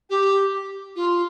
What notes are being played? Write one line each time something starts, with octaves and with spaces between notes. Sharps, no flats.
G4
F4